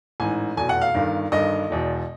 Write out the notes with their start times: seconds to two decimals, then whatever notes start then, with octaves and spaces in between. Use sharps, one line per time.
0.20 A1 G#2 E3 G#5
0.57 F1 E2 B2 G#5
0.69 F#5
0.82 F5
0.94 G1 G2 D#3
1.32 G1 G2 D#3 D#5
1.70 E1 E2 B2